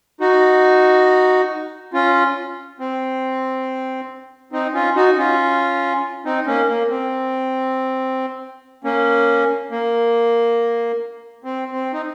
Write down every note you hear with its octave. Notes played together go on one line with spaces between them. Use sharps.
D#4 F#4
C#4 F4
C4
C4 D#4
C#4 F4
D#4 F#4
C#4 F4
C4 D#4
A#3 C#4
A#3
C4
A#3 C#4
A#3
C4
C4
D#4